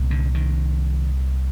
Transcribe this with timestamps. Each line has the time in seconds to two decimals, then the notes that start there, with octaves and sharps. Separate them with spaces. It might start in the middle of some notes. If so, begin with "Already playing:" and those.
Already playing: C2 A#2
0.11 D3
0.35 D#3